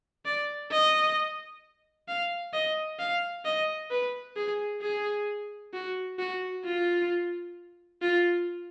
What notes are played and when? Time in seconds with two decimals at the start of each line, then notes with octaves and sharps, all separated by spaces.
0.25 D5
0.71 D#5
2.08 F5
2.53 D#5
2.99 F5
3.45 D#5
3.91 B4
4.37 G#4
4.82 G#4
5.73 F#4
6.19 F#4
6.65 F4
8.02 F4